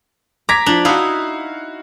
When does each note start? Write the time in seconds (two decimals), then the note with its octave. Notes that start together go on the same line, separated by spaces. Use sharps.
0.49 A#5 D6 G#6 B6
0.66 F3 D4 F7
0.85 D#4 E4 F#4 F5